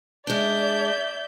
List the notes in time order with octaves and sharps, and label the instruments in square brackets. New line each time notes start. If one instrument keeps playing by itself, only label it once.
[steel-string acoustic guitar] G#3 D4 [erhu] D5 [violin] E5 G6